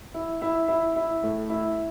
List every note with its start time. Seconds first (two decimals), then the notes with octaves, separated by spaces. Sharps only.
0.14 E4
0.42 E4
0.68 E4
0.96 E4
1.23 A2
1.50 E4